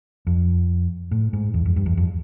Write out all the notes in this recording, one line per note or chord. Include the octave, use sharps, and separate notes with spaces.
F2
A2
G#2
E2
F2
G2
E2
F2